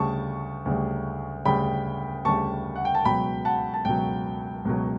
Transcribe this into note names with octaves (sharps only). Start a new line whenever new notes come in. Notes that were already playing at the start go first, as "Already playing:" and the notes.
Already playing: D2 C#3 G3 A5 C#6
D2 C#3 G3
D2 C#3 G3 G5 B5
D2 C#3 G3 A5 C#6
F#5
G5
A5
C#2 B2 F#3 G5 B5
F#5 A5
A5
C#2 B2 F#3 G5
C#2 B2 F#3